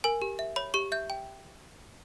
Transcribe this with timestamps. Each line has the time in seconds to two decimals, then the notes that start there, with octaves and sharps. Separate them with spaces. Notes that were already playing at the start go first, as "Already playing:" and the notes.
0.04 A#4 G#5
0.22 G4
0.39 E5
0.56 C#5 B5
0.74 G4 C#6
0.92 E5 G6
1.10 G5